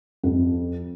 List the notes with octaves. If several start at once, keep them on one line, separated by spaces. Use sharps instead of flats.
F2